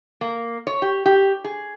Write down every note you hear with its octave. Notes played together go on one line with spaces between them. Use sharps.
A#3
C#5
G4
G4
G#4